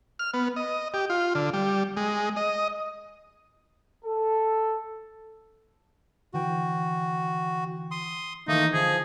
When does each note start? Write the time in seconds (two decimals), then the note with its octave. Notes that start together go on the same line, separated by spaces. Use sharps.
0.19 F6
0.34 B3
0.56 D#5
0.94 G4
1.10 F4
1.35 D3
1.53 G3
1.97 G#3
2.36 D#5
4.05 A4
6.34 D3 E3 F#4 G5
7.91 C6 D#6
8.48 D#3 E3 A3 A#3 D#4
8.73 D3 F3 G#4